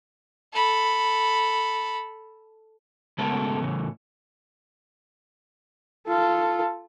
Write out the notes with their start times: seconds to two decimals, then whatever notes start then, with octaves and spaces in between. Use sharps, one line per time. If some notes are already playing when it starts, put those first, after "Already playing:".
0.53 A4 B5
3.18 C#3 G#3 A3 B3 A4 A#4
3.61 A2 C#3 E3
6.07 F4 A4